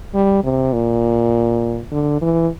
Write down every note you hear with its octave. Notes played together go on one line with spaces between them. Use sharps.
G3
C3
A#2
D3
E3